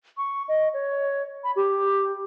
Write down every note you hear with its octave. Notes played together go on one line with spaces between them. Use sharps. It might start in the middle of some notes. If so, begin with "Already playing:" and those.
C#6
D#5
C#5
B5
G4